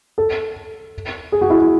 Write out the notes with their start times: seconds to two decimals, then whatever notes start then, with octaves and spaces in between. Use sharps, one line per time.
0.18 A4
1.32 G#4
1.41 F#4
1.50 E4